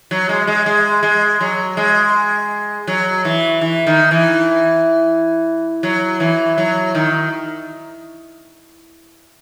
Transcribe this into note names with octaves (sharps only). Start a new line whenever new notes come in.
F#3
G#3
G#3
G#3
G#3
F#3
G#3
F#3
E3
E3
D#3
E3
F#3
E3
F#3
D#3